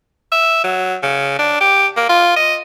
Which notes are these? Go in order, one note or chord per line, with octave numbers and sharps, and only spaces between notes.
E5
F#3
C#3
D4
G4
A#3
F4
D#5